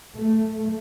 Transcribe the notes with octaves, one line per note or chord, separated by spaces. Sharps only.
A3